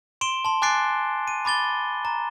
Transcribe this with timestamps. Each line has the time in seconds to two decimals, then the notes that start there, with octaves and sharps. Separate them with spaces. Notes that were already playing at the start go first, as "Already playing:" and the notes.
0.21 C6 D7 E7 G7
0.45 A5 C6
0.62 G#5 D6 F#6 A6 C7 D7
1.27 D#7
1.45 B5 D6 A6 G7
2.05 A#5